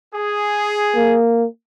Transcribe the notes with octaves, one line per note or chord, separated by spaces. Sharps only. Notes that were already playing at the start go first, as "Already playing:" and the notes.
G#4
A#3